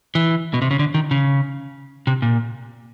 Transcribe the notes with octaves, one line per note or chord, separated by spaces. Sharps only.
E3
B2
C3
C#3
D3
D#3
C#3
C3
A#2